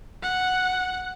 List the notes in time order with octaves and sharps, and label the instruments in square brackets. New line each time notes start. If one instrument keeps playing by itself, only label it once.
[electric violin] F#5